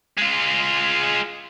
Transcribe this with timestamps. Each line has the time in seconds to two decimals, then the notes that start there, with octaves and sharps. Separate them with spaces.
0.18 G#3 F4